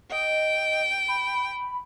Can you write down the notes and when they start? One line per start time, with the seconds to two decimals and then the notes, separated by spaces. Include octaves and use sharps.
0.11 D#5 G5
1.08 B5